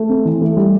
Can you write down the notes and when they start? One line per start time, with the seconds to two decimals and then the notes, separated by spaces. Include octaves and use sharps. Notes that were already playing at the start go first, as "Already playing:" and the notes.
Already playing: A3
0.09 C4
0.25 E3
0.41 A3
0.57 G3